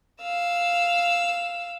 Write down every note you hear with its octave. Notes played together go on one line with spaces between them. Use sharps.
F5 E6